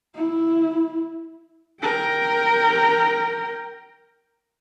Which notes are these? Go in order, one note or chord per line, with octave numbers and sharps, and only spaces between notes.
E4
A#4 G5